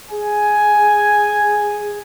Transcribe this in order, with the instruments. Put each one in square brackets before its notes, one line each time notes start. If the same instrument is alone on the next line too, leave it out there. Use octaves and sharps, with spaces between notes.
[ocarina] G#4 [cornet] G#5